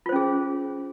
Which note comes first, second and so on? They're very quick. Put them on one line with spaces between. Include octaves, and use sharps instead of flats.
F4 C5 C#4 G#4